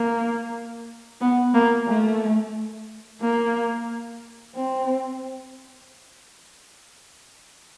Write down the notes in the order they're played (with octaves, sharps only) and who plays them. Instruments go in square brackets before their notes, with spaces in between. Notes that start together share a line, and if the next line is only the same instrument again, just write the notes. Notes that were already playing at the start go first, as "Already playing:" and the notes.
Already playing: [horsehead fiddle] A#3
B3
A#3
A3
A#3
C4